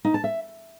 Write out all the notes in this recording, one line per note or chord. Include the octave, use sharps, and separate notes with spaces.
D#4
A5
E5